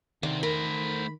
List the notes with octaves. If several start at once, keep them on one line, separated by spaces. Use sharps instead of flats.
D2 C3 D#3 C4
A3 A#4 C5 B5